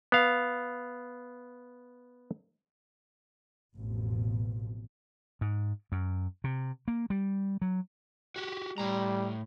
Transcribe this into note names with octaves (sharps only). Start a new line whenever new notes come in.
B3 F5
A1 F2 B2
G#2
F#2
C3
A#3
G3
F#3
F#4 G4
A2 G3 A#5